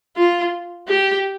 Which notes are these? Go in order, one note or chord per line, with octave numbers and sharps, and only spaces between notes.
F4
G4